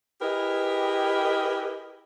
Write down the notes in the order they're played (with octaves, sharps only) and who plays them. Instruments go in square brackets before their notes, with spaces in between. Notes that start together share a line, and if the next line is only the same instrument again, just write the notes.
[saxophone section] E4 G4 G#4 A#4 B4 D#5